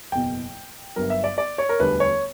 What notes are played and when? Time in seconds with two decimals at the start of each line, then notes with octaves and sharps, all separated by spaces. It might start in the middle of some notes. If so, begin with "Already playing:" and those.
0.12 F#1 E2 B2 G5
0.96 G1 G2 F#3 B3 A#4
1.10 E5
1.24 D5
1.38 D5
1.58 C#5
1.69 A#4
1.79 E1 D2 D3 G3 B4
2.00 C#5